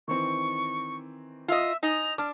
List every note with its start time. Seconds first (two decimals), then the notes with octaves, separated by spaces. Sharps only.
0.08 D#3 E3 C4 C#6
1.48 F4 D#5 E5
1.83 D#4 D#5 G#5 F7
2.18 D4 D6 F6